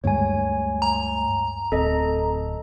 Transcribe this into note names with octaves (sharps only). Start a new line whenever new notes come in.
D2 G2 G#3 C#5 G#5
A#5
D1 C4 A4 D#5